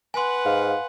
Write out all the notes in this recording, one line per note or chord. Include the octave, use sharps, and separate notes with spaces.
B4 F#5 G#5 C6
G#2 F5